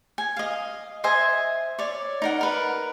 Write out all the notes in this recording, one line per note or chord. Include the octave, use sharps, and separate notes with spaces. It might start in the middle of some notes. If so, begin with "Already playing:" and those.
G#5
D#5 F5
C5 D#5 E5 G#5
C#5 D5
D#4 A#4 F#5
A#4 B4